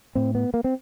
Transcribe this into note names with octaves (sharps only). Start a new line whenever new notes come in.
A2 C4
B3
A#3
C4